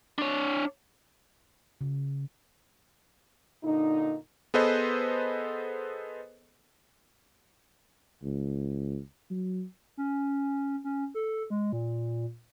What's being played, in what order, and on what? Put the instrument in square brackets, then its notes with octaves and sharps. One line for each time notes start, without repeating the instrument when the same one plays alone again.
[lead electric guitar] D4 C#5
[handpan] C#3
[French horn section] A#2 D3 D#4
[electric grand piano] B3 G#4 A4 B4 C5 D#5
[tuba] C#2
F#3
[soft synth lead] C#4
C#4
A4
G#3
A#2